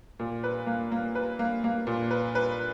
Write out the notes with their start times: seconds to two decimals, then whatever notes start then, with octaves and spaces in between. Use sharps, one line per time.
0.19 A#2
0.44 B4
0.67 A#3
0.92 A#3
1.15 B4
1.39 A#3
1.64 A#3
1.87 A#2
2.11 B4
2.35 B4